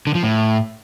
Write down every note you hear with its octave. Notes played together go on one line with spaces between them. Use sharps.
D3
F3
A2